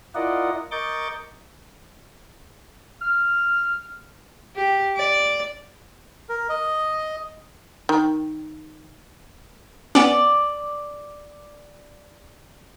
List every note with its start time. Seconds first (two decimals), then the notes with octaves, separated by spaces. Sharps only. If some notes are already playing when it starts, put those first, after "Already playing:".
0.15 E4 F4 A#4 D5 D#5 F#5
0.71 A#4 D#5 C#6 D6 G6 A6
3.02 F6
4.56 G4
4.96 D5
6.29 A#4
6.49 D#5
7.89 D#3
9.95 B3 C#4 D5